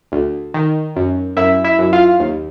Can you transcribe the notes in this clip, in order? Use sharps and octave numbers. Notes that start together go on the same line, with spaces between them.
D2
D#3
F#2
F#2 E4 E5
E4 E5
F#2
F4 F5
D#2